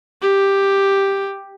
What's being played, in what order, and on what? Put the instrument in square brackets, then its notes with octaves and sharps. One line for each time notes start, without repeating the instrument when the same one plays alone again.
[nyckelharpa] G4